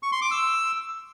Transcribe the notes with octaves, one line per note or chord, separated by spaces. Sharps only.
C#6
C6
D6
E6